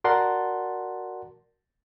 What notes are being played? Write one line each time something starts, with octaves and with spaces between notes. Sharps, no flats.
F#4 A#4 D5 F#5 A5 C6